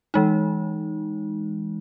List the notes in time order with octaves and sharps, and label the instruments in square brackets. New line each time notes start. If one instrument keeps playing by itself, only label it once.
[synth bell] E3 G#3 D#4